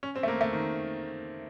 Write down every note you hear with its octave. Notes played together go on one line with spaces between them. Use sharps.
C#4
C4
A3
A#3
A3
D#3